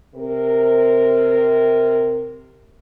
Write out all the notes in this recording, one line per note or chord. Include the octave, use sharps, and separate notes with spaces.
C3 A#4